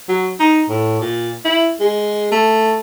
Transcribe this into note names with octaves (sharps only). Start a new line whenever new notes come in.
F#3
D#4
A2
A#2
E4
G#3
A3